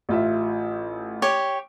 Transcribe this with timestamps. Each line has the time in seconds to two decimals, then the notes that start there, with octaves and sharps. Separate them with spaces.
0.09 A1 F4 E5
1.22 G4 C#5